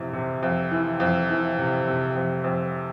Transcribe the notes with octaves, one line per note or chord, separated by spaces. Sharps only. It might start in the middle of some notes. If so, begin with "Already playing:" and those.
Already playing: F2 C3 E3
C3
F2
E3
F2
E3
C3
C3
F2
F2